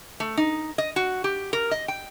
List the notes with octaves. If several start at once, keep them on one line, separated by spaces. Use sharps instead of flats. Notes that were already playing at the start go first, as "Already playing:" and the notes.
A3
D#4
D#5
F#4
G4
A#4
D#5
G5